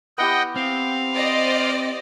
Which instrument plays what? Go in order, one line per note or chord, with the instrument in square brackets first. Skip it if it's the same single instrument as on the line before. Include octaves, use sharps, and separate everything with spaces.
[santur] B3 E4 G4 [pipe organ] D#5 F#5 G5
[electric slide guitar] C4 [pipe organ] F5
[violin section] C5 D5 D#5